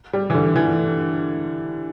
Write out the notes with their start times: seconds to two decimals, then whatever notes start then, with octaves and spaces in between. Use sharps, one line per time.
0.13 G3
0.30 E3
0.35 D3
0.56 E3